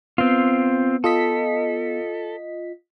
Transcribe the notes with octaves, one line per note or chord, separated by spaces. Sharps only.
B3 C4 F4
F4 A4 D#5 B6